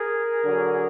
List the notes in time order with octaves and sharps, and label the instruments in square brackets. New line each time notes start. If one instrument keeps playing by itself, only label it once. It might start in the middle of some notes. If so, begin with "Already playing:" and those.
Already playing: [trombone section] G#4 A#4
D3 F#3